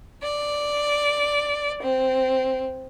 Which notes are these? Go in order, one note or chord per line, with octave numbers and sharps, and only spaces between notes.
D5
C4